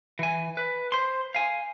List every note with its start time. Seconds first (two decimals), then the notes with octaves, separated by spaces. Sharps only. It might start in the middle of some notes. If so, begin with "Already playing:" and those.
0.19 E3 G#5
0.57 B4
0.92 C5 C6
1.35 F5 G#5